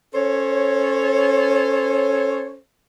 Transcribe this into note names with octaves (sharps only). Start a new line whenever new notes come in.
C#4 A4 C5 C#5